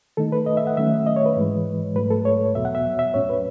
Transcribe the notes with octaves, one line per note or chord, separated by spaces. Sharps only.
D#3 A3 D#4 A4
B4
D#5
E5
F#5
D#3 F#3 A3 C#4 E5
D#5
C#5
B4
G#2 E3 G#3
G#2 F#3 A3 B4
A4
C#5
E2 B2 F#3 B3 E5
F#5
E5
E5
A2 F#3 C#4 C#5
B4